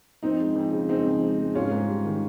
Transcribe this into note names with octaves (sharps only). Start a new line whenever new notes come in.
F2 C4 D#4
G#3
F2
C#3
G#3 C4 D#4
F2
G#3
G#3
G#2 C#4 F4
G#2
G3
D#3